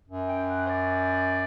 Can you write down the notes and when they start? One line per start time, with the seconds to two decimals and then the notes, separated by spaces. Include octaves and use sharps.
0.08 F#2
0.29 G5
0.49 F#5
0.66 C5
0.70 D5